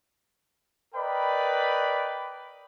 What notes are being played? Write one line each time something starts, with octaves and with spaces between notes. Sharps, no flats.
A#4 B4 D5 D#5 G5 B5